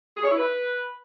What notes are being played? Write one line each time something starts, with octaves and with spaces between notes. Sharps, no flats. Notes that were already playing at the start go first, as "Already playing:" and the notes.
G#4
C#5
E4
B4